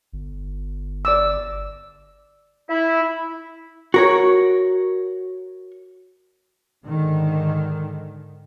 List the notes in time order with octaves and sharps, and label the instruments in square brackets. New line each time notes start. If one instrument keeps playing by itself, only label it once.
[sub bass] G1
[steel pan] D5 D6 E6
[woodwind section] E4
[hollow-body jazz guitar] F#4 A#4 C#5
[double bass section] G#2 D3 D#3